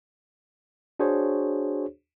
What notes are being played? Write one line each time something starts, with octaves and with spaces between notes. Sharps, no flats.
D4 F#4 G#4 C5 C#5